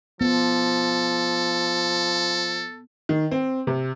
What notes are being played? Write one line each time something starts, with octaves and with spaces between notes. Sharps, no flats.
F3 B3 A4
D#3
C4
C3